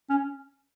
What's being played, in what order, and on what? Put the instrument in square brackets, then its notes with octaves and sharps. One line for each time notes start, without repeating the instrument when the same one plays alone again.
[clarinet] C#4